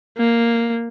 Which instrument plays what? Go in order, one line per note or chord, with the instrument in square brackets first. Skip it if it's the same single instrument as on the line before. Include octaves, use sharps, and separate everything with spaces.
[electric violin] A#3